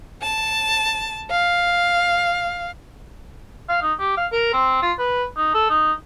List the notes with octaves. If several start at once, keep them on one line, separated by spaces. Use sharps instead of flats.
A5
F5
F5
D#4
G4
F5
A#4
C4
F4
B4
D#4
A4
D#4